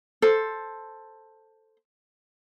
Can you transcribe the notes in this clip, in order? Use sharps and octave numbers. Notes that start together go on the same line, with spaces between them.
A4 C5